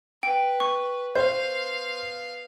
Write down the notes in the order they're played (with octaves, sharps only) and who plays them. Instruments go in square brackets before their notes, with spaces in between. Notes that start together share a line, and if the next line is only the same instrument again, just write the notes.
[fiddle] B4 [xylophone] G5
[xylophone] C#6
[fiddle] B3 F5 [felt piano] C5 [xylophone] G6